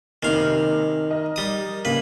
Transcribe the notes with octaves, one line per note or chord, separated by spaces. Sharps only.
F#1 C3 D#3 F5
A#4 D#5
G3 D#6
C#3 A#3 B4